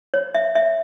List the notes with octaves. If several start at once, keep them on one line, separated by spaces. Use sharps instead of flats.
C#5
E5
E5